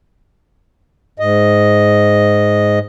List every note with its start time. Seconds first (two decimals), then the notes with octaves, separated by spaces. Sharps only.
1.19 G#2 D#5